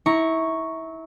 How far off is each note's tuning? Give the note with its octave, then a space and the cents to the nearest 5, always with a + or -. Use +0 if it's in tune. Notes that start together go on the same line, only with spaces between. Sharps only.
E4 -25 A#5 +0 C#6 +0